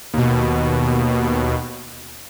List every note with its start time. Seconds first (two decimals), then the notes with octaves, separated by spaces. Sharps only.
0.14 D#2 B2